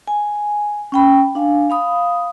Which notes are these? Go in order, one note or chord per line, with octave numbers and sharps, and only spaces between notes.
G#5
C#4 G5 B5
D4 F5 G#5
F5 B5 D#6